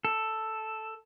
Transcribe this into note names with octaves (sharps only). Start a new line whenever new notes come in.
A4